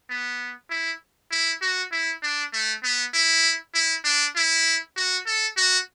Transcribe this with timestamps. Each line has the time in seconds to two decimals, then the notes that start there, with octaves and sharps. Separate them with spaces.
0.10 B3
0.70 E4
1.31 E4
1.62 F#4
1.92 E4
2.23 D4
2.53 A3
2.83 B3
3.13 E4
3.74 E4
4.04 D4
4.35 E4
4.96 F#4
5.26 A4
5.57 F#4